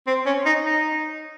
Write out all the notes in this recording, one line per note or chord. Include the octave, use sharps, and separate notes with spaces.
C4
C#4
D#4
D#4